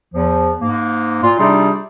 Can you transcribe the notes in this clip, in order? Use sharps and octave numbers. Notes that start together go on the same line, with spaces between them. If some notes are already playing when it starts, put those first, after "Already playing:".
E2 F3
G#2 A#3
A#2 F4
C3 G3 D4 D#4 F4 G#4